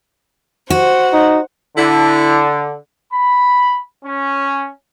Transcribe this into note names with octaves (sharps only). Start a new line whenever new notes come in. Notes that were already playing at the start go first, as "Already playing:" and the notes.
F#4 C5 F#5
D#4
D3 E4
B5
C#4